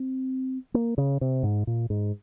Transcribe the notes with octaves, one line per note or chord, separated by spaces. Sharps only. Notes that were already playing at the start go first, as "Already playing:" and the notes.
Already playing: C4
A#3
C#3
C3
G#2
A#2
G#2